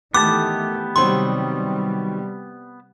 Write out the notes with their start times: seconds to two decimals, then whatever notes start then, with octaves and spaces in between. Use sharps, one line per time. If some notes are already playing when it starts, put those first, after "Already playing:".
0.14 D#3 E3 A3 B3 G4 A5 D6
0.96 C3 D#3 F#3 G3 C4 C6